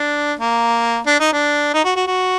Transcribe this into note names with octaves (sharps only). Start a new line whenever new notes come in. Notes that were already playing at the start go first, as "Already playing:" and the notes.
Already playing: D4
A#3
D4
D#4
D4
D#4
F#4
F#4
F#4